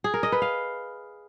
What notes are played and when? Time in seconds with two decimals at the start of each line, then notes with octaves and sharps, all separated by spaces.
0.04 G#4
0.14 A#4
0.23 D#5
0.32 B4
0.42 F5